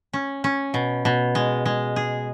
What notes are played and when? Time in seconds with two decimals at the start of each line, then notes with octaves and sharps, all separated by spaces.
0.13 C#4
0.44 C#4
0.74 B2
1.05 B2
1.35 G#3
1.65 G#3
1.96 G#4